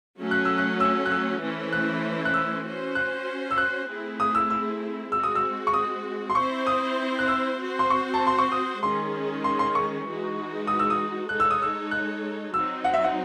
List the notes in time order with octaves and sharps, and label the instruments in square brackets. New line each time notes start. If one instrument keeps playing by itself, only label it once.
[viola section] F#3 A3 C#4
[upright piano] F#6
E6
F#6
E6
F#6
E6
[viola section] E3 A3 C#4 E4 C5
[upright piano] F#6
F#6
E6
[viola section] C#4 F#4 C5
[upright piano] F#6
E6
F#6
[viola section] A3 C4 E4 G#4
[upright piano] D#6
E6
E6
[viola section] G#3 C4 F#4 [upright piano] E6
[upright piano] D#6
E6
C#6
D#6
C6
[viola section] C4 E4 C5 [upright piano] C#6
[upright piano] D#6
F#6
E6
[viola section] C4 F#4 C5
[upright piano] C6
C#6
A5
C6
C#6
D#6
[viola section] D#3 G#3 C#4 G#4 [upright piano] C6
[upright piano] C6
C6
C#6
[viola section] E3 G#3 D#4 F#4
[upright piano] D#6
E6
D#6
[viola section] G#3 D#4 A4 C#5 [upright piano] F#6
[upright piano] E6
D#6
E6
F#6
[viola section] F#3 C4 D#4 F#4 [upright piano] E6
[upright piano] F#5
E5
F#5